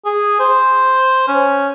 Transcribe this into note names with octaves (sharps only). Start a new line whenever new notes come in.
G#4
C5
C#4